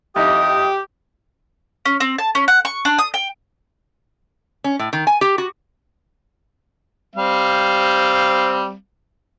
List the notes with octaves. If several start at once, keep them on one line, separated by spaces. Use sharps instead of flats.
F2 D#4 E4 G4 D#6
C#4
C4
A5
C#4
F#5
C#6
D4
D#6
G5
C#4
A2
D#3
G#5
G4
F#4
G3 C4 F5